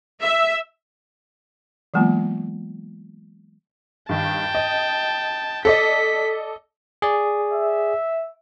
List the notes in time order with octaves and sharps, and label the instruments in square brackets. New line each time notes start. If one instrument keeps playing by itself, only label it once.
[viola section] E5
[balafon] E3 F#3 G#3 A#3 B3 F4
[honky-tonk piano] G2 D#3 [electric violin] G5 A5
[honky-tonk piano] D#5
[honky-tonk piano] A4 D5 D#5 [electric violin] B6
[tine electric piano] G#4 D5
[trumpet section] E5